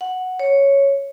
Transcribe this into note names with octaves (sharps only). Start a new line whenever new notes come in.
F#5
C#5